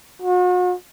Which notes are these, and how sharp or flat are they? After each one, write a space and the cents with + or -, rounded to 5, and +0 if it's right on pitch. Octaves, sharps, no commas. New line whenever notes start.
F#4 -40